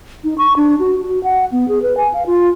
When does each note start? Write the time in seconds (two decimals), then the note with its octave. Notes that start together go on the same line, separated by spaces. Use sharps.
0.24 D#4
0.38 C#6
0.56 D4
0.79 F#4
1.02 F#4
1.24 F#5
1.52 B3
1.68 G#4
1.82 B4
1.97 G#5
2.14 F5
2.26 F4